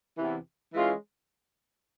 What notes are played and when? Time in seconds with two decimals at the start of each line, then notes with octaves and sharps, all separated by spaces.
0.17 E2 C3 E3
0.72 E3 G#3 C#4 F4